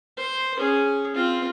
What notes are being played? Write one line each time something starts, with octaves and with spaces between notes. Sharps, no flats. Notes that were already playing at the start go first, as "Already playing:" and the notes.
C5
C#4 G#4
C4 F4